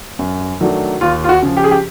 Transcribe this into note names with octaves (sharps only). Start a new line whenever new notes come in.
F#2
D#3 F#3 A3 D4
D#2 F4
F4
F#4
C#3 F3
G4
G#4
G4